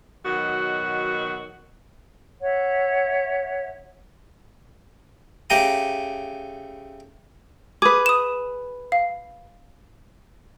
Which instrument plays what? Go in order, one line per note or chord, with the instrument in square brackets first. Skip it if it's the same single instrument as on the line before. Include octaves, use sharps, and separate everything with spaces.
[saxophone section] B2 D#3 F#3 F#4
[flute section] C#5 E5 F#5
[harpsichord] C#3 A3 G4 G5 A#5 D#6
[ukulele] G#4 B4 [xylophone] D6
[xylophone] D#6 E7
F5